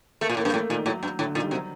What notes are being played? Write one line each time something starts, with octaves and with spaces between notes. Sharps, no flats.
A3 A#3
A#2
A2 A#3
G2
A2 A3
A#2 D#3
A2 F#3
G2
A2 D3
A#2 D#3
G3
C3 F#3